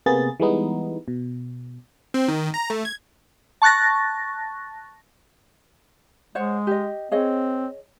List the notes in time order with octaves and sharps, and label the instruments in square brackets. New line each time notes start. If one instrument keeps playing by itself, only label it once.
[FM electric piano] C3 A#3 B3 G#4 A6
E3 G3 G#3 B3 D#4
B2
[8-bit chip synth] C4
D#3
A#5
A3
G#6
[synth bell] A5 C#6 F#6 A6 A#6
[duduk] G#3 [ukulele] C5 C#5 F#5
[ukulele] G4 D#5
[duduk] C4 [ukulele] G#4 C#5 D#5